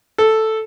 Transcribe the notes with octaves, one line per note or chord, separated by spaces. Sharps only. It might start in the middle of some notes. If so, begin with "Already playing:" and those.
A4